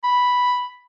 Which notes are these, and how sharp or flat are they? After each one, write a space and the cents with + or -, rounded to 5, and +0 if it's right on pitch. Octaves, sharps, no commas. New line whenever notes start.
B5 +0